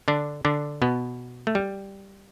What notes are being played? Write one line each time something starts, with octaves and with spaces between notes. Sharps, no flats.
D3 D4
D3 D4
B2 B3
A3
G3